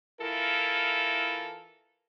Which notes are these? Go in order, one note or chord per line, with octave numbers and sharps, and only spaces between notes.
E3 E4 F4 A4 A#4